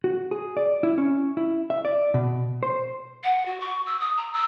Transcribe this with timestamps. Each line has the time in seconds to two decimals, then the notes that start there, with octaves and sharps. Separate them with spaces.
0.04 F#4
0.31 G#4
0.57 D5
0.83 E4
0.98 C#4
1.37 E4
1.70 E5
1.85 D5
2.14 B2
2.63 C5
3.24 F#5
3.46 F#4
3.60 C#6
3.86 E6
4.00 D#6
4.17 A#5
4.33 E6